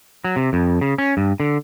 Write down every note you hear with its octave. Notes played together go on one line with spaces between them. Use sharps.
F#3
C3
F2
C#3
C#4
G2
D3